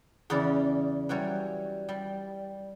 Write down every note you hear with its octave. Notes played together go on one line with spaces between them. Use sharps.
E2 C#3 E3 C#4 E4 D5
E3 F#3 G3 C#5
G3